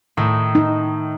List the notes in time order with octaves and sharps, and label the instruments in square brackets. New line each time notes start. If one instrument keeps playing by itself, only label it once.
[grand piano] A2 [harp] D#3
[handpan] D#4